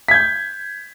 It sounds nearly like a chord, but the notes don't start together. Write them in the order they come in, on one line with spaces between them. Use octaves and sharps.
B6 G#6 G6